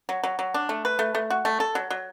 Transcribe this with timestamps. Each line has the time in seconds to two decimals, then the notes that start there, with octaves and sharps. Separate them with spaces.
0.09 F#3
0.23 F#3
0.39 F#3
0.54 D4
0.69 A3
0.85 B4
0.99 A3
1.15 A3
1.30 F#4
1.45 A3
1.60 A4
1.75 F#3
1.90 F#3